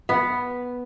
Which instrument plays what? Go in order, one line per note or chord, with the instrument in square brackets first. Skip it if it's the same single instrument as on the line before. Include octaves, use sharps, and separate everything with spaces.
[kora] B3